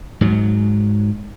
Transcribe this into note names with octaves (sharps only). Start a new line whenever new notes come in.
G#2 F#3